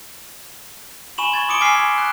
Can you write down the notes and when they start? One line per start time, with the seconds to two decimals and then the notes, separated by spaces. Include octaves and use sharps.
1.18 G#5 B5 C#6 E7 F#7
1.31 C6 C#6 G#6 A6
1.48 C6 D6 D#6 C#7 D7 G7
1.61 G#5 D6 E6 F6 B6 C7
1.75 G#5 B5 G#6
1.98 F#6